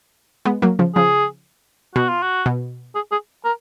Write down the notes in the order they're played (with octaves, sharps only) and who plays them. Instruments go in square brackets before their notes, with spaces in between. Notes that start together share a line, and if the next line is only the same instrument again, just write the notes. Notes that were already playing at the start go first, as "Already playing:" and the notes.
[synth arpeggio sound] G#3 B3
F#3 A#3
C#3 F3
[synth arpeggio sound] C#3 F3 [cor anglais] G#4
[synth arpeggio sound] B2 [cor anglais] F#4
[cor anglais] F4
F#4
[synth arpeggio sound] B2
[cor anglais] G#4
G#4
A#4